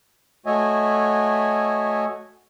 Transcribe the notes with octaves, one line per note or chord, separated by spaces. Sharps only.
A3 F#4 C#5 D#5 E5 G#5